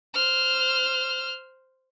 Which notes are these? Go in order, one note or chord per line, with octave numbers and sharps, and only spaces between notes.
C5 F6